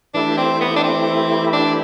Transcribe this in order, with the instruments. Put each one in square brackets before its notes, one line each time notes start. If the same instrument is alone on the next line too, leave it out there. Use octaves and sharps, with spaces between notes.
[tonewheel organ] E3 A3 E4 G4 [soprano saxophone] D4
[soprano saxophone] C4
B3
D4
C4
D4